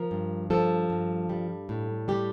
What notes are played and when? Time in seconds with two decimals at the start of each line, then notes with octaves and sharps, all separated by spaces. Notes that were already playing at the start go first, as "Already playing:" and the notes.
Already playing: F3 A#4
0.11 G2
0.50 F3 A4
0.90 G2
1.29 G3
1.69 A2
2.08 G3 G4